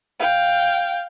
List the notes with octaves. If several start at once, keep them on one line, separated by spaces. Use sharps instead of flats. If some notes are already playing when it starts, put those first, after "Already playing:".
F5 G5